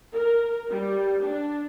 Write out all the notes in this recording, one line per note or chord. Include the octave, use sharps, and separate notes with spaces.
A#4
G3
D4